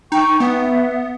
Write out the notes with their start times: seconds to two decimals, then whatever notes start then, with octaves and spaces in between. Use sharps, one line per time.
0.12 D#4 G5 C#6
0.40 B3 B4 E5